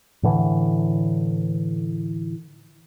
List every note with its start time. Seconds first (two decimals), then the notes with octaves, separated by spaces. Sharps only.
0.23 A2 D3 E3